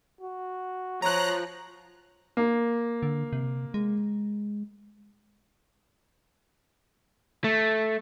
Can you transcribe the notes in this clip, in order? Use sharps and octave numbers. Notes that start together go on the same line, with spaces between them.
F#4
F3 C#5 A#5 F#6
A#3
D3
C3
G#3
A3